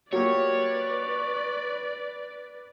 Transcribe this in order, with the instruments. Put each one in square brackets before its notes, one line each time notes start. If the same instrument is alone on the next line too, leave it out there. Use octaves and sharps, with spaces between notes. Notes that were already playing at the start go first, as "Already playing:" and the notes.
[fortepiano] F#3 A#3 G4 [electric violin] B4 D5 [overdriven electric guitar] C#5